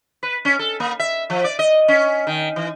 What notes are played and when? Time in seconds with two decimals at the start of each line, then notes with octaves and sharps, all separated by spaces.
0.23 B4
0.45 C#4
0.59 A4
0.80 A#3
0.99 E5
1.30 F3
1.44 D5
1.59 D#5
1.88 C#4
2.27 D#3
2.56 E3